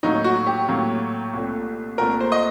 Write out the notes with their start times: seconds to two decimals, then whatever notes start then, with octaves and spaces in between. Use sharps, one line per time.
0.03 A2 F#3 A#3 D#4
0.24 F#4
0.46 G4
0.69 A2 F#3 A#3
1.33 C2 A#2 A3
1.98 C2 A#2 A3 A#4
2.20 C5
2.32 D#5